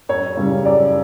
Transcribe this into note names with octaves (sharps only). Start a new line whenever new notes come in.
F#2 C#5
C#3 G3 C#4
F#2 D5